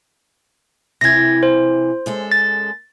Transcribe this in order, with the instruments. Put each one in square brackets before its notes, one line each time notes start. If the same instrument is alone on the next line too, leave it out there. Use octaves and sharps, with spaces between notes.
[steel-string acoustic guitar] C3 E3 [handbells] G#6 A#6
[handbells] C5
[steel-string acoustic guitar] F#2 G#3 A4
[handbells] A6